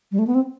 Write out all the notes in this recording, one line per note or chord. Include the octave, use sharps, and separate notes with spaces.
G3
A3
B3
C4